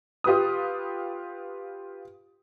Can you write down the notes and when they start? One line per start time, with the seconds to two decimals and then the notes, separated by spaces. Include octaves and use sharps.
0.24 F4 G4 B4 D#6